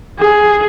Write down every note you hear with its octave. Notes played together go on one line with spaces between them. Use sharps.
G#4